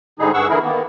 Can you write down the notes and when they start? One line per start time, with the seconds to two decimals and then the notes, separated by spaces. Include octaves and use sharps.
0.19 G#2 D3 G3 D#4 G#4
0.34 G2 G#4 F#5 C#6 E6
0.49 D3 E3 A3 E4 G#4 A#4
0.62 D#3 A#3 B3